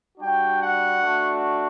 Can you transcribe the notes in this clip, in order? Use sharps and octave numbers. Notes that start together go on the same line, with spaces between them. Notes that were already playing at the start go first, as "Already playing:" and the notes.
G3 D4 F#4 G5
F#5
A3 D4 F#4